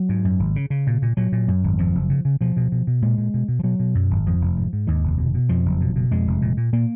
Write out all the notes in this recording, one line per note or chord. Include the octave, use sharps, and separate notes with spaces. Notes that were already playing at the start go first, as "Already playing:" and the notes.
Already playing: F#3
G#2
F#2
G#1
C#3
C#3
A#2
A#2
A#2 F#3
A#2
F#2
G#1
F2 F3
F#1
C#3
C#3
B2 F3
B2
B2
B2
A#2 G#3
A#2
B2
B2
F3
B2 F#3
B2
F#2
G#1
F2 F3
F1
G#2
G#2
D#2 D#3
F1
B2
B2
F2 F3
F#1
B2
B2
F2 G#3
F1
A#2
A#2
A#2 A#3